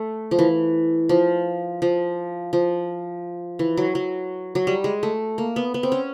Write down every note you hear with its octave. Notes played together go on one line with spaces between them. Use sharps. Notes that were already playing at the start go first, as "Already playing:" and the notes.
Already playing: A3
F3
E3
F3
F3
F3
E3
F#3
F#3
F#3
G3
G#3
A3
A#3
B3
B3
C4
C#4